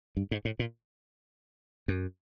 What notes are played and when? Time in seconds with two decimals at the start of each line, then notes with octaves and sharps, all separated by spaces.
0.17 G2
0.31 G#2
0.45 A2
0.59 A#2
1.88 F#2